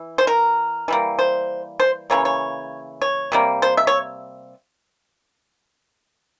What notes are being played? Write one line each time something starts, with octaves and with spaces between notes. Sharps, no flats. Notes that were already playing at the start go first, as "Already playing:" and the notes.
Already playing: E3
C5
A#4
E3 G3 A#3
C5
C5
C#3 E3 A#3 C#5
C#5
C#5
C3 G3 A#3
C5
E5
C#5